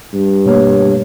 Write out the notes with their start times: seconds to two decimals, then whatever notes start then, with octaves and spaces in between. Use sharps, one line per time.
0.13 G2
0.46 B2 A3 A#3 C#5